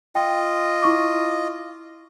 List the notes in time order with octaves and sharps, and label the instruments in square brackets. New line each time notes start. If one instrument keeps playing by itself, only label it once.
[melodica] F4 D#5 [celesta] G5
[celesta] E4 C#6 D6